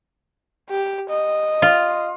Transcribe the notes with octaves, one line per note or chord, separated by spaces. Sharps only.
G4
D#5
F4